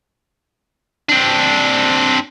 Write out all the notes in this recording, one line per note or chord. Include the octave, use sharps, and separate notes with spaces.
C4 D4